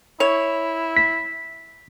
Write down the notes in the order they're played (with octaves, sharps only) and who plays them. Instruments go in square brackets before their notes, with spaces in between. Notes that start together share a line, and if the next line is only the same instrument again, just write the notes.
[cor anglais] E4 [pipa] C#5
[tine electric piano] B6